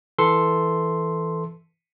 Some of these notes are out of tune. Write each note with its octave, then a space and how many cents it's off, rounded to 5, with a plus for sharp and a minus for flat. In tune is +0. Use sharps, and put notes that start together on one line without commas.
E3 +0 A4 +0 C6 +0